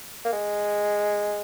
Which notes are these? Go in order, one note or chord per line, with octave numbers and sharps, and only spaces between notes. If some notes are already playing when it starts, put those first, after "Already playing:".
A#3
G#3